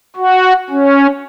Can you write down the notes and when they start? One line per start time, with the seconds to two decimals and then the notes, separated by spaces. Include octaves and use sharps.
0.16 F#4
0.70 C#4